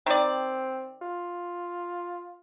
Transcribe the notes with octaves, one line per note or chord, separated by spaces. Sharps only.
D#3 C4 D5
F4